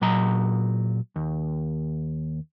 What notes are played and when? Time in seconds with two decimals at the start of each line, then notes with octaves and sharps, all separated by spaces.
0.02 A#2 F#3 A#5
1.16 D#2